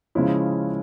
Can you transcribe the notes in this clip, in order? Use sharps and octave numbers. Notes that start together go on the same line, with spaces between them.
C#3 F3 G#3 C#4 E4